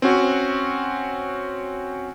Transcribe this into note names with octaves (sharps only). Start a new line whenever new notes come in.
C4 C#4 F#4